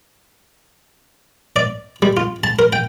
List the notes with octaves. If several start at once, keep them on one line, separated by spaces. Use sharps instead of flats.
D5
G3
F4
A5
A#4
G5